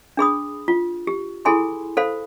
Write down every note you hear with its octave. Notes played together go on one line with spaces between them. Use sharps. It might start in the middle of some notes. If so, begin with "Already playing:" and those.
D4 G#4 B5 D#6
F4
G4
E4 G#4 A4 G#5 B5 C6
A4 C5 F5 B5